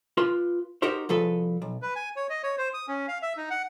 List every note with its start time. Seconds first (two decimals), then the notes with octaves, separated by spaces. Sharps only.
0.17 F4 B4 C6
0.82 D#4 F#4 G4 A#4 C5
1.09 C2 F3 G#4 A4 B4
1.62 B1
1.82 B4
1.96 G#5
2.16 C#5
2.30 D#5
2.43 C#5
2.58 C5
2.74 D#6
2.88 C#4
3.08 F5
3.22 E5
3.37 D#4
3.50 F#5